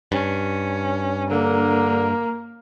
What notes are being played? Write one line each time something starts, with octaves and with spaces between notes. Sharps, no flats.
G2 C#4
D3 A#3 A#4